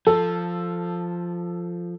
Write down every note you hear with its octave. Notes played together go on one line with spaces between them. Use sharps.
F3 A4